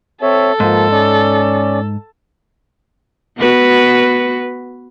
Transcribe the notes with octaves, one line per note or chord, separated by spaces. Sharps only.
C4 A4 C#5 E5
G#2 F3 A#3
C#4 D5
B3 F#4 B4